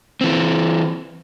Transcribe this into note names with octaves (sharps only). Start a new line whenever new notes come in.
E3 C4